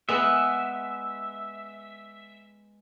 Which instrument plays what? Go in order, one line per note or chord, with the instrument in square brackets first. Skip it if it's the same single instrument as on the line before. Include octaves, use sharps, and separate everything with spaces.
[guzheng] G#3 B3 [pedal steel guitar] E5